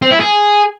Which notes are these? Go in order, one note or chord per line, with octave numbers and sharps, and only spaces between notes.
C4
E4
G#4